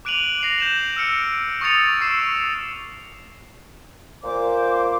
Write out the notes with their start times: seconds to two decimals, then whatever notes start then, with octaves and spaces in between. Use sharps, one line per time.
0.05 D6 F#6 D7 D#7 F7 F#7
0.41 A#6 C7 F7
0.58 G6 E7 F#7
0.96 E6 F6 C#7 D7
1.61 C#6 D#6 E6 A6 C#7 F7
2.01 C#6 E6 C7 D7 E7
4.24 A#2 C5 D6